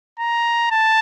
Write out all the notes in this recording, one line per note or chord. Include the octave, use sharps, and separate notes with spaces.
A#5
A5